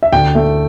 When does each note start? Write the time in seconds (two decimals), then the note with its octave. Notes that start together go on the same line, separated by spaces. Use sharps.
0.03 E5
0.12 D2 G5
0.35 A3